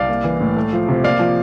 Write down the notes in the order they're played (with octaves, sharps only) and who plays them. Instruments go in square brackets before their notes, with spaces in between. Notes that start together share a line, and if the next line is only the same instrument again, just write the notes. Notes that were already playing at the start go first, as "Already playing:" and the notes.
Already playing: [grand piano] C2 D5 F5
A#3
E3
A2
A3
F3
C3
A#3 D5 F5
F3